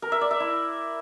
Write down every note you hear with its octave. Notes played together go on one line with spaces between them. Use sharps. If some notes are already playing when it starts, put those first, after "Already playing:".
A#4
E5
D5
E5
E4